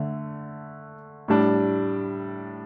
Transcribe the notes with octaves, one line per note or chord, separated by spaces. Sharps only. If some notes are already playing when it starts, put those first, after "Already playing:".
Already playing: D3 A3
A2 G3 D4